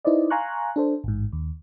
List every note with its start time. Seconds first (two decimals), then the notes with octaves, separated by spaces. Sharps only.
0.05 D#4 E4 B4 C5 D5 D#5
0.30 F5 G#5 A#5 C6 C#6 F#6
0.76 D4 A4 C5
1.04 A1 G#2
1.33 D#2